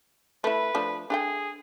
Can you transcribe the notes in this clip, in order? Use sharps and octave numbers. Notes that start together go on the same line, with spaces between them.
A3 E4 B4
F3 A3 D4
D4 G#4 A4 G5